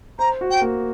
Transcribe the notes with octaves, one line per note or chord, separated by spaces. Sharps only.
C5 A#5
F#4
G5
A#3